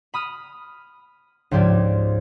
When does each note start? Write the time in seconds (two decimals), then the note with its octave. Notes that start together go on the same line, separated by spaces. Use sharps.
0.14 B5 D#6 F6
1.51 C#2 G#2 F3 G4 D5 G#6